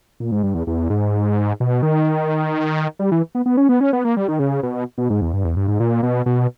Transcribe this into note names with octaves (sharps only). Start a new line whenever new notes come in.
A#2
G#2
G2
E2
E2
G#2
B2
D#3
G3
E3
B3
B3
C#4
B3
C#4
B3
A#3
G3
D#3
C#3
B2
B2
G#2
E2
G2
E2
G2
G#2
A#2
B2
B2